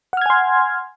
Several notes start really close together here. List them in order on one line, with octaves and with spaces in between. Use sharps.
F#5 F6 G#6 G#5 C6